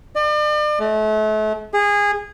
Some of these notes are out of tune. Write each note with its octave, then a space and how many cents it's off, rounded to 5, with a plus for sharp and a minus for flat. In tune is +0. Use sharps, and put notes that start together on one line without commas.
D5 +40
A3 -35
G#4 -20